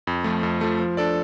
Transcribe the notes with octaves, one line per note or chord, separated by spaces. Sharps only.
F2
F3 A3
F2
F3 A3
F3
D4 A4 D5